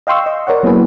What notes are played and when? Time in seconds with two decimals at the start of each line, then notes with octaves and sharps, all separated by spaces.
0.07 D#5 F5 G5 C6 C#6 E6
0.26 D#5
0.47 A#4 C#5 D5 F#5
0.63 F#3 A#3 B3 E4 G#4 B4